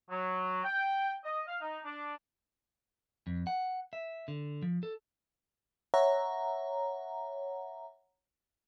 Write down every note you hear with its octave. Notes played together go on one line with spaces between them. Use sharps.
F#3
G5
D#5
F5
D#4
D4
F2
F#5
E5
D3
F3
A4
C#5 E5 F#5 A#5